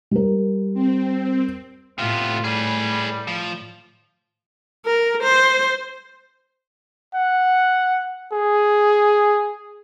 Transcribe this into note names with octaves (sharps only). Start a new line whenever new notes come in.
G3 A#4
C4
A2 C3 B3 F4
G3 G#4 B4
F3
A#4
C5
F#5
G#4